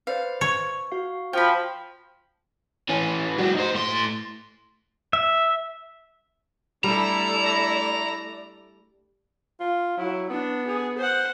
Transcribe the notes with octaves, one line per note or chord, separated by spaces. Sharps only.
B4 C5 D5 F5
C#5
F#4 F5
F3 G5 B5
E3 C#4
G3 F#4
D#4 C5
A2 C6
E5
G3 A3 D4 E4 A4 D5 A#5
F4
F#3 E4
B3 D4
G#4
C5 F#5